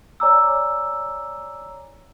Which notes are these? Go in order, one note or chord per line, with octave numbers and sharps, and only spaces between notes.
C#5 D5 G#5 A#5 D6 E6